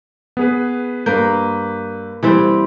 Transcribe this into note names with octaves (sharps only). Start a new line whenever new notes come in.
B3 G#4 B4
G2 A#3 B4 G6
E3 G3 C4